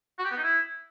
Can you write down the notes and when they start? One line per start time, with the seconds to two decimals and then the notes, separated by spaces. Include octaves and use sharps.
0.19 F#4
0.25 G4
0.31 B3
0.37 D#4
0.43 E4